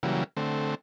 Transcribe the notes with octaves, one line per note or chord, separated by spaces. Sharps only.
C#3 E3 F#3 G3 A#3
D3 A3 C4